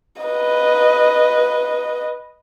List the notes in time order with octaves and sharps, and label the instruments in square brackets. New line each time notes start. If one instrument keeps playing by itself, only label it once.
[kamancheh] B4 D#5